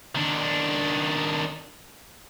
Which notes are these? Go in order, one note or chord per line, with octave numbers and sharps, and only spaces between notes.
D#3 D4